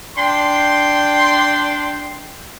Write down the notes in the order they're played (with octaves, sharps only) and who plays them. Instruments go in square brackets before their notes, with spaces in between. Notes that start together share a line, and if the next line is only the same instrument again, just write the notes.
[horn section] D4 G5 C6